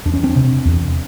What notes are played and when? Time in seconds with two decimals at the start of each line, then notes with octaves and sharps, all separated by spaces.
0.05 E2 D4
0.14 C#4
0.23 C4 D4
0.36 C3
0.65 E2